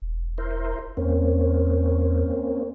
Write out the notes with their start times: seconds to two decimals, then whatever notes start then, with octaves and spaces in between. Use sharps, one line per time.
0.02 E1
0.38 E4 A#4 C5
0.97 E2 A#3 C4 C#4